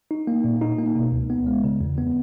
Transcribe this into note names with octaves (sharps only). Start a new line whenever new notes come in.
D#4
A#3
A#2
D#4
A#3
B2
C#2
B3
G#3
C#3
E2
B3